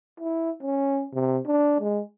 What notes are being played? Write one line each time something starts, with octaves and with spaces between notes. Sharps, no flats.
E4
C#4
C3
D4
G#3